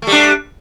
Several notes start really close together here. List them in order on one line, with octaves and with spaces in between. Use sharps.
A3 G3 D4